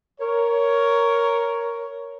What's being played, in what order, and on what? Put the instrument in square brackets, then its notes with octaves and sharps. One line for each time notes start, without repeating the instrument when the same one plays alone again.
[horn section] A#4 C#5